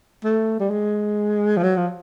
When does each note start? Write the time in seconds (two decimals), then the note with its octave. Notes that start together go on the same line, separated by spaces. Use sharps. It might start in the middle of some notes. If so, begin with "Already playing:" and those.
0.24 A3
0.60 G3
0.70 G#3
1.57 F3
1.63 F#3
1.77 F3